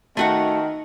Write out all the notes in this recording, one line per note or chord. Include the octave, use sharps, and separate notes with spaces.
D#3 A3 F#4 F#5